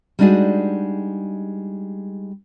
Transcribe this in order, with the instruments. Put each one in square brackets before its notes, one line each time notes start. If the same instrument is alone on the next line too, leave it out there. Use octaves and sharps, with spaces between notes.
[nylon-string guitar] G3 G#3 D4 D#4 F#4 G#4